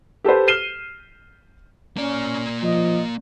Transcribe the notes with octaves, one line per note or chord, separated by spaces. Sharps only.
G4 A4 B4 C5
F6 C7 D#7 E7 G7
A#3 C#4 D5
F3 D#5